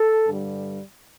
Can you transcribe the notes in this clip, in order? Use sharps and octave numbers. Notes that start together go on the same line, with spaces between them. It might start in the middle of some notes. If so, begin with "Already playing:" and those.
Already playing: A4
G2 D3 G3